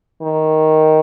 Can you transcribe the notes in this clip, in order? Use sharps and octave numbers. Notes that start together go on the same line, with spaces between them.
D#3